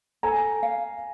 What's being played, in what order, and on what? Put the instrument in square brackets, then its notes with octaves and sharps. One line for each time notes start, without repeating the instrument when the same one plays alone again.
[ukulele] A4 [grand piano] G#5 A#5
[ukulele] F5